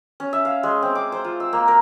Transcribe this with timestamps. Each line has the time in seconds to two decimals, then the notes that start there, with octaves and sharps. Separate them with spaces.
0.20 C#4
0.33 E5
0.45 F5
0.63 G#3
0.82 C4
0.95 D6
1.12 C5
1.25 F4
1.40 E6
1.53 A#3
1.68 A#4